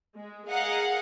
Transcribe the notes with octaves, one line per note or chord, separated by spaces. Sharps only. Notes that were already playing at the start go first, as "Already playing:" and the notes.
G#3
G#4 A#4 D#5 F5 F#5